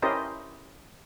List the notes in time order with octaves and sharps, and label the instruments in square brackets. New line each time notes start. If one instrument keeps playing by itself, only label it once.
[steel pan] C#4 E4 G4 A#4 C5 D#5